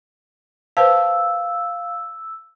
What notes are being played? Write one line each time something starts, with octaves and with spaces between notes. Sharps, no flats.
B4 C5 F5 A5 E6